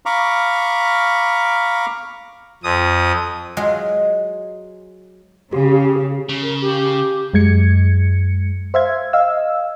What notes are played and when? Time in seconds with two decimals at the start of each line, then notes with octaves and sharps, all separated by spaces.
0.06 F5 A#5 B5 C#6 D6
2.63 F2 D#6
3.57 F#3 G#3 F4 G#4
5.53 C#3 G4
6.29 C#3
6.42 A#4
6.61 G4
7.34 F#2 G#3 G#6 C#7
8.74 C5 E5 F5 G#6
9.13 D#5 F5 E6